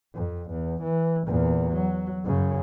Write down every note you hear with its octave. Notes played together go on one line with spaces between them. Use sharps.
F2
E2
E3
E2 A#2
F#3
F#2 C#3